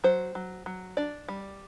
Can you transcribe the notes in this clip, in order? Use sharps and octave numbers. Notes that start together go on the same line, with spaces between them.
F#3 C5
F#3
F#3
D4 D5
G3